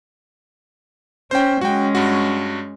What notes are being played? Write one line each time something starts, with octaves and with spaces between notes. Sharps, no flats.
C#4 C5 G5
G#3 C#4 F#4 G5
G2 F#4